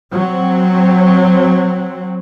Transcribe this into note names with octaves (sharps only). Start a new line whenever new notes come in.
F#3 C4